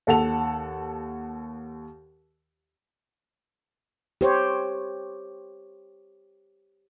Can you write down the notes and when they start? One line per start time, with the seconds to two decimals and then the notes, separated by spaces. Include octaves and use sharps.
0.07 D#2 A4 F#5 A5 F7
4.21 G4 C5 C#5